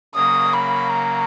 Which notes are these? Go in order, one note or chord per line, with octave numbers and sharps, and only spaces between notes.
C#3 F#3 A#3 D#6
B5
A#5